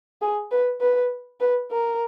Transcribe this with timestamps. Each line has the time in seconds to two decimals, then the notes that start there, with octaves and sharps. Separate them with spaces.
0.22 G#4
0.51 B4
0.81 B4
1.40 B4
1.71 A#4